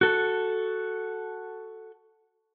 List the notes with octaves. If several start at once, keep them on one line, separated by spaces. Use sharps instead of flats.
F#4 A4